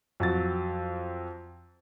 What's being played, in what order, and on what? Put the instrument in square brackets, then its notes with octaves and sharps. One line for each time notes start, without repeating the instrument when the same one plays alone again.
[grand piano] F2 F#3 A6